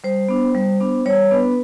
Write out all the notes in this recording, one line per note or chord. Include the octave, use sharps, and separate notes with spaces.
G3 C5
B3 D4
G3
B3 D4
G3 C#5
B3 D4 B4